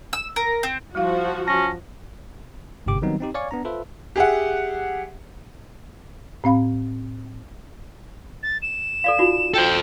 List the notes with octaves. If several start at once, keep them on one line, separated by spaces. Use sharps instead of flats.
E6
A#4
C4
F3 G3 E4 F#4 F5
C#4 A5 A#6
G1 G#2 C3 G4 D6
D#3 F#3 G3 B3 C4 D#4
C4 D#4 G4 C5
C#5 D5 F5 G#5 C#6
B3 D4 A#5
F4 A4 B4 C5 E5
G4 G#4 E5 F#5
A2 C4 F5 B5
A6
E7
A4 D5 F5
D#4 F4 F#4
A4 C5 G5